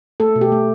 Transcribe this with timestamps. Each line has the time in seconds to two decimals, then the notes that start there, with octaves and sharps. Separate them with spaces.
0.20 A3 A4
0.36 B2
0.41 G4
0.52 A3